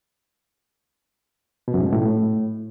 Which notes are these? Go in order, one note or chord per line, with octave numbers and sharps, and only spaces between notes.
B2
F#2
G#2
B2
A2